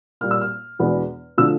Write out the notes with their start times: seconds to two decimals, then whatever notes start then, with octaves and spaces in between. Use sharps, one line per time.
0.21 A#2 G3 A#3 F6
0.31 E6
0.41 F6
0.79 E2 B2 G#3 B3 D4
1.37 D3 F3 A3 E6